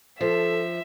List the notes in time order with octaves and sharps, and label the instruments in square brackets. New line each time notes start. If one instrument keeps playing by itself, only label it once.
[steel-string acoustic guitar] F3 [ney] A4 [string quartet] E5